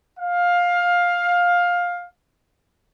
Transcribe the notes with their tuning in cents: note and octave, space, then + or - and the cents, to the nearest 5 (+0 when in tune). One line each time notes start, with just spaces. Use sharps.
F5 +15